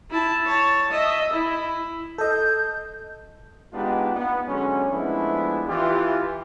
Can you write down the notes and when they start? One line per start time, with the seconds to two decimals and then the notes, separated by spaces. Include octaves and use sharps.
0.10 E4 A5
0.46 C#5 A5
0.91 D#5 E5
1.33 E4
2.18 A4 D#5 G6
3.73 G#3 B3 D4 D#4 F4 G4
4.15 B3
4.47 D3 F#3 G#3 C#4
4.90 F3 G#3 A3 B3 D4 E4
5.67 E3 F4 G4